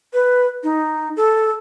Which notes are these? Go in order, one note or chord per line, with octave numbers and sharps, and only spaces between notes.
B4
D#4
A4